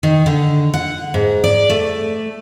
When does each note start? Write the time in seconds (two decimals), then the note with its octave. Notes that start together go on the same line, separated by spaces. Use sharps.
0.03 D#3
0.26 D3
0.74 F#5
1.14 G#2
1.44 D5
1.70 A3